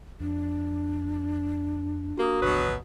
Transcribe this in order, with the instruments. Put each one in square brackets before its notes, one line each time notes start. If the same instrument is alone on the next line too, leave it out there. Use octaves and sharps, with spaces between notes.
[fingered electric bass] F2 [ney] D4
[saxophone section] A#3 [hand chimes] F#4 G4 D#6
[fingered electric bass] G#1 D2 F3 [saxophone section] B2 F#3 B4